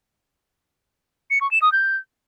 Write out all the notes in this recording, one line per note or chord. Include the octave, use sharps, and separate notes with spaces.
C#7
C#6
E7
D#6
G6